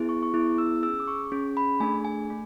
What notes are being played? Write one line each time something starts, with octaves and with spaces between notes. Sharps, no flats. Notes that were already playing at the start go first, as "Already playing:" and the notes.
Already playing: B3 E4 G#4
C#6
C#6
B3 E4 G#4 D6
E6
C#4 G#4 E6
D6
C#6
C#4 G#4
B5
A3 D4 G#4 G#5
G#5
A3